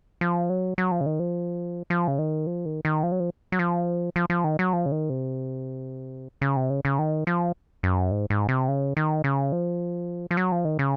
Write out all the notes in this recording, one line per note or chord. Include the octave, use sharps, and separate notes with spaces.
F3
F#3
F#3
F3
C#3
D#3
F3
F3
C#3
D#3
F3
D#3
D#3
F3
F#3
F3
F#3
F3
F3
F3
D#3
F#3
F3
C#3
D#3
C3
C#3
C3
C#3
C#3
D#3
F3
F#2
G#2
G#2
C3
C#3
D#3
C#3
F3
F3
F#3
F3
D#3
C#3